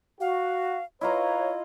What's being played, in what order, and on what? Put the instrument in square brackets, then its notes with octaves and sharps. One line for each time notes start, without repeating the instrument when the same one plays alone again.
[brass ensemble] F#4 [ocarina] F5
[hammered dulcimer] E4 F4 A#5 [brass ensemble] B4 C#5 [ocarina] D#5